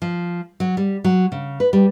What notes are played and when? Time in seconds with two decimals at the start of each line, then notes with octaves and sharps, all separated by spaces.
0.02 F3
0.60 F#3
0.77 G3
1.04 F#3
1.32 C#3
1.60 B4
1.73 G3